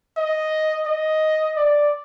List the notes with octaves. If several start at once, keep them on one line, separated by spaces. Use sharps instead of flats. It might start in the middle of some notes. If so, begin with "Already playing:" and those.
D#5
D#5
D5